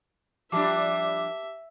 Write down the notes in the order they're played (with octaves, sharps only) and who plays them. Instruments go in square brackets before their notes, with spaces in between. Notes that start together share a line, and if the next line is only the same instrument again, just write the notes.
[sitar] F3 G3 D4 [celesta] G4 A5 D6 [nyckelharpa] E5